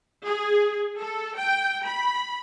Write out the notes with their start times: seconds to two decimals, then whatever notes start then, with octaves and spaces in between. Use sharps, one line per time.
0.25 G#4
0.99 A4
1.36 G5
1.87 B5